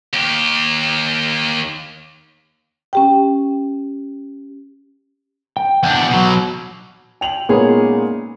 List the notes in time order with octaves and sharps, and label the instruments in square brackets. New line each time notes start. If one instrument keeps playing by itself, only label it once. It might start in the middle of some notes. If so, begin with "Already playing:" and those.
[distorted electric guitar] D#2 G4
[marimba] C#4 G4 G5
[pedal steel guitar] G5
[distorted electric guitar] E2 D4 [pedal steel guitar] F#5 G6
[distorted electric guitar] B2 F#3
[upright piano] G5 F7 F#7
A#2 G#3 B3 C#4 D#4 G#4